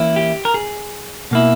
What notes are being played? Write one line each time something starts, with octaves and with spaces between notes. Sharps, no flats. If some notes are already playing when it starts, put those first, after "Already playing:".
Already playing: E3 A#3 C#4 E4
G4
A#4
G#4
B2 A#3 E4